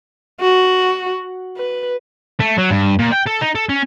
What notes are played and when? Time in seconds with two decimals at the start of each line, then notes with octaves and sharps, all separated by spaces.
0.40 F#4
1.57 B4
2.40 A3
2.58 F#3
2.70 G2
2.99 A#2
3.12 G5
3.27 A4
3.42 D#4
3.55 A4
3.69 C#4